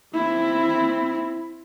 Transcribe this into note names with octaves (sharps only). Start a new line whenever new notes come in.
C4 E4